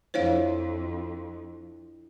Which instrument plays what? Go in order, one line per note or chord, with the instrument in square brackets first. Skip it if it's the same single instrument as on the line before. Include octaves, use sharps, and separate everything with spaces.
[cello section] F2 [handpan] D4 E4 F4 [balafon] C5 C#5 F5